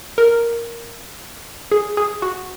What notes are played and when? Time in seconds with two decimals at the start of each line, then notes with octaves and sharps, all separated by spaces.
0.18 A#4
1.71 G#4
1.97 G#4
2.22 F#4